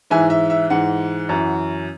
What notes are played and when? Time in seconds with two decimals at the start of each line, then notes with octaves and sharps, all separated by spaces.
0.10 G#2 E3 E5 G#5
0.30 E5
0.50 E5
0.70 G#2 E3 F#5
1.29 F#2 E3